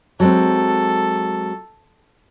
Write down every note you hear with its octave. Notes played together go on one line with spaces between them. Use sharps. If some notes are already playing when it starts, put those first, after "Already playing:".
F#3 G#3 C4 A4